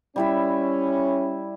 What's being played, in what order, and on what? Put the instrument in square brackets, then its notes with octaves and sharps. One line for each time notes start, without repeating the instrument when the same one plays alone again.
[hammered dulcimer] G3 E4 E5 [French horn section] C#4